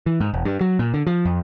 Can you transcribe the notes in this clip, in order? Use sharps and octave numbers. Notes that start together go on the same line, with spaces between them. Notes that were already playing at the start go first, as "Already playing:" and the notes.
E3
G#2
E1
G2
F#3
A#2
D3
F3
F2